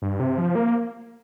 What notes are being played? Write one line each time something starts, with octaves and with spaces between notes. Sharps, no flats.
G2
C3
F3
A#3